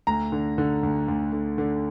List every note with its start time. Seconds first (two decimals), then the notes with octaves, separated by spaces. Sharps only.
0.07 D2 A#5
0.32 D3
0.58 D3
0.83 D2
1.08 D2
1.32 D3
1.58 D3